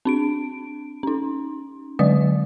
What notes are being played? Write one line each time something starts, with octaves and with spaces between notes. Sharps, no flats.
C4 D4 D7
C#4 D#4
D3 F#3 G#3 D5 D#6